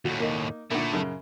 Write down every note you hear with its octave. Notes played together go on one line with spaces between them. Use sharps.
D#2 A2 F#4
A#3 D#4
A#2 D3 A3 E4
F#2 C#3